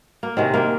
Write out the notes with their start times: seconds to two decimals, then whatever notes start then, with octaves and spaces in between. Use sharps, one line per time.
0.23 A#3
0.37 C3 D#3 G#3 C4
0.54 A#3